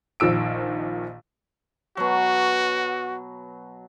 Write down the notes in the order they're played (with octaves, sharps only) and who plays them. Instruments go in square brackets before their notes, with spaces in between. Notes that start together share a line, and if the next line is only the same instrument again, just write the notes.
[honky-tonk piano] A#1 D#3 F3 E6 D7
[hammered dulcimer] B2 F#3 [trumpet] F#4